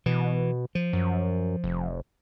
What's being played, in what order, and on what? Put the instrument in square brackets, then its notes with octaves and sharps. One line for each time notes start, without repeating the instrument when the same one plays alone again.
[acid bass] B2 [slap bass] E3
[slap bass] F3
[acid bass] F#2
F1